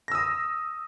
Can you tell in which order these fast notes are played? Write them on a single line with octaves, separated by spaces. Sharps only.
A#6 E6 D#6